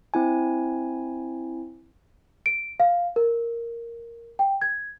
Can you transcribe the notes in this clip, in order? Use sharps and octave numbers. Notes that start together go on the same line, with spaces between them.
C4 E4 G#5
D7
F5
A#4
G5
G#6